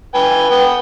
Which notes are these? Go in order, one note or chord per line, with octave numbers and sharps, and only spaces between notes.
B4 G5 G#5
B3 G5